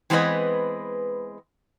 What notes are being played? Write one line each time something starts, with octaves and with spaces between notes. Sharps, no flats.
E3 G#3 B3 C4 B4 D#5